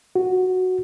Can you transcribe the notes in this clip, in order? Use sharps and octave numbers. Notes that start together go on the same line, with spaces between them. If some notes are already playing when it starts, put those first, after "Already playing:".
F#4